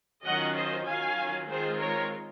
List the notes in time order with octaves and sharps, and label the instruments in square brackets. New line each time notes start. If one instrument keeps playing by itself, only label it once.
[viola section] D#3 F#3 C#4 F4 D#5 F#5
C5 D#5
D#3 F#3 C#4 F4 F5 G#5
D#3 G#3 C4 F4 G#4 C5
A#4 C#5